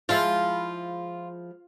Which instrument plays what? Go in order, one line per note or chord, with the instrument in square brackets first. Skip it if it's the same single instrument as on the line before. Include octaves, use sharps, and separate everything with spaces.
[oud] F3 G#3 E4 [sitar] F4